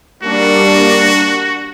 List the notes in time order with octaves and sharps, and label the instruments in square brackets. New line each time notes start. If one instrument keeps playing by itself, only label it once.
[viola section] G3 A#3 D4 [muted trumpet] F#4